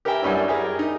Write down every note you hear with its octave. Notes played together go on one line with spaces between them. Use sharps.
G4 A#4 B4 E5 G5 G#5
F#2 G3 C#4 D4 E4
G4 G#4 A#4
D#4